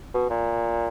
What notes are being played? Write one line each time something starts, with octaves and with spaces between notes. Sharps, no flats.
B2
A#2